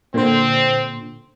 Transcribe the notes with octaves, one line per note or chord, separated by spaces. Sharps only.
A#2 D3 C4 C5